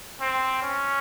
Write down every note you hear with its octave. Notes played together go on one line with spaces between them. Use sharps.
C4
C#4